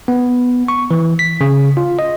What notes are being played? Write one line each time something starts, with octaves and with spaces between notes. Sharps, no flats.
B3
C#6
E3
B6
C#3
F4
D#5